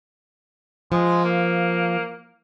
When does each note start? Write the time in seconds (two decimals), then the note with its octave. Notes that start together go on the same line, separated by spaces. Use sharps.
0.92 F3 G#3
1.25 A#3